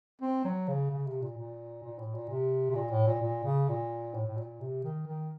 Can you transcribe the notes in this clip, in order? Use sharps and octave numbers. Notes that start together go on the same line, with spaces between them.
C4
F#3
C#3
C#3
C3
A#2
A#2
A#2
A2
A#2
C3
C3
A#2
A2
A#2
A#2
C#3
A#2
A2
A2
A#2
C3
D#3
D#3